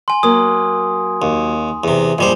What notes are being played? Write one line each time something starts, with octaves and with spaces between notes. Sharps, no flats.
G#5 C6
F#3 A#3 D#6
D#2
E2 C3
A#1 G#2 F3 G3 C5